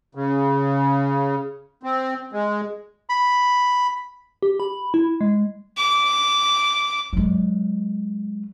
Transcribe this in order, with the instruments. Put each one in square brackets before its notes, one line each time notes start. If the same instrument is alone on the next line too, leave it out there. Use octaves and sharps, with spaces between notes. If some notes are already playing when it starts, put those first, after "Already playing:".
[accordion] C#3
C4
G#3
[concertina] B5
[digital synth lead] G4
B5
E4
G#3
[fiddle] D6
[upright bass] F#3 G#3